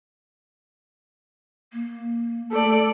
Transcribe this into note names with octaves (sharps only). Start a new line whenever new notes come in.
A#3
A3 A4 D5